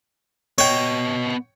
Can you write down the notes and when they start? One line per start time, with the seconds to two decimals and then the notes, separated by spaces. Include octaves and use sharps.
0.58 B3 C#5 D#5 G5